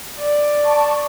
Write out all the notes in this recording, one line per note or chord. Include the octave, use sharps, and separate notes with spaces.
D5
A5 C#6